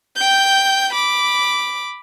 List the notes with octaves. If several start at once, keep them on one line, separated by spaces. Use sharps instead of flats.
G5 G6
B5 D6